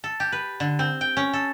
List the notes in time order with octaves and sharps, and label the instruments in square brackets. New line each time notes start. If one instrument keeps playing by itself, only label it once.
[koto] A4
G4
B4
D3
C4
G5
C#4
A4